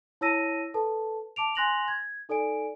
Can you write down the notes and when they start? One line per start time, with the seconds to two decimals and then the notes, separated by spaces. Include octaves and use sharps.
0.21 E4 C#5 A5 E6 A#6 D#7
0.74 A4 B4 A5
1.36 A5 D6 D7 F7
1.55 G#5 C6 F#6 A#6 F7 F#7
1.88 G#6
2.29 D#4 A4 D5 G#5 D7